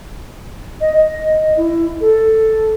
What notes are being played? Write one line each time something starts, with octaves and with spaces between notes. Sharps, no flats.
D#5
D#5
E4
A4